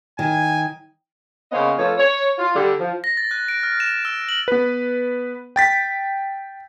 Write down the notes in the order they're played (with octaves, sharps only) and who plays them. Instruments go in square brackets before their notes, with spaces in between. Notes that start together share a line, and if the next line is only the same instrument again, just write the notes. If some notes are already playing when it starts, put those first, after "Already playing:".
[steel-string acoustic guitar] D#3 [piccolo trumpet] G#5
[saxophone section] C#3 A#3 B3 C5 C#5 D#5
F2 F3 A3 A4 B4 C#5
C#5
F4
D3 G3
F3
[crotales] A#6
A6
F#6
D7
F6
E7
E6
F#7
[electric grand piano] B3 B4
G5 A6 B6